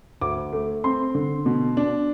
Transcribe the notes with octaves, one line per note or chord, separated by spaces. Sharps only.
D2 D6
A3
C4 C6
D3
B2
D4